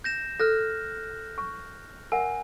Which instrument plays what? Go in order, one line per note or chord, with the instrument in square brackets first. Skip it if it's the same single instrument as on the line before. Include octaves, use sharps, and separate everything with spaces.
[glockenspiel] G6 A#6 E7
[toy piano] A4 [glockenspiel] F6 F#6 A#6
[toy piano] C#6
[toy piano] A#4 E5 F#5 [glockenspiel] G#5